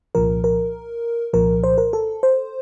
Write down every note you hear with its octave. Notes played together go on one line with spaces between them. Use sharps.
C2 A#2 F3 A#4
A#4
C2 A#2 F3 A#4
C5
A#4
A4
C5